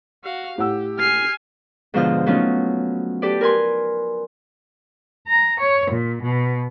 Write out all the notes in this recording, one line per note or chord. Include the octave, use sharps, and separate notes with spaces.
F#4 F5
A2 G4 F#5 E6
G#5 F6 C7
G#2 B2 D3 F3 F4 F6
F#3 A3 B3 C#4 D#4 F4
G4 A4 B4 D5
A#4 B4 G#5 C6
A#5
C#5
A#2
B2